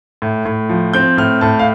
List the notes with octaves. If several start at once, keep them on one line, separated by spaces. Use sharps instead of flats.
A2
A2
F3
C4 G6
A2 F6
A2 A5
F5